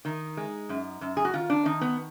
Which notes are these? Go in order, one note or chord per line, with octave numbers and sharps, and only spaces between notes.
D#3 D#4
G#3
F#2
F#2
G#4
F#4
D#3 F4
D4
D#3 D#4
B3